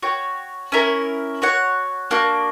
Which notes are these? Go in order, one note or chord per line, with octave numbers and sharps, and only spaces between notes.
F#4 C#5 G5
C#4 E4 A#4
F#4 C#5 F#5
A#3 D4 F#4